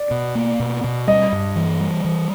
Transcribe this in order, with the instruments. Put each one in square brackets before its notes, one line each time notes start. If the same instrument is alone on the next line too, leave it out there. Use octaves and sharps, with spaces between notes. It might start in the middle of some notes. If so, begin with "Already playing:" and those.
Already playing: [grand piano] D5
[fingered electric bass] B2
A#3
B2
B2
[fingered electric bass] G3 [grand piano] D#5
[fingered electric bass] G2
E3
G3
E3